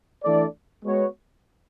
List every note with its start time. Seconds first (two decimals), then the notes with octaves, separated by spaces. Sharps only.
0.23 E3 A3 D4 A4 D5
0.84 G#3 B3 F#4 C#5